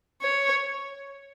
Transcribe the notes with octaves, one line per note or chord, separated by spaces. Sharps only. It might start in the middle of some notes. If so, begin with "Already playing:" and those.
C#5